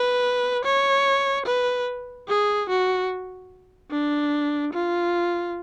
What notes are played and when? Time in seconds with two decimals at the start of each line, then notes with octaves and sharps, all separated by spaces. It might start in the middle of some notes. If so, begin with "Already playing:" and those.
Already playing: B4
0.65 C#5
1.46 B4
2.28 G#4
2.69 F#4
3.91 D4
4.74 F4